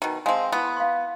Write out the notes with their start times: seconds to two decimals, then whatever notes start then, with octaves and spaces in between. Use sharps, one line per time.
0.02 B2 D#3
0.26 G#3 C4 F5 G#5 A5
0.52 B3 E4 B4 C6
0.77 F5 C6